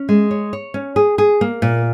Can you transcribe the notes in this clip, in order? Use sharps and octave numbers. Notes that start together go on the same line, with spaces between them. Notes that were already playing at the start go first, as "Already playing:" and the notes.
Already playing: C#4
G#3
C#5
C#5
C#4
G#4
G#4
A#3
A#2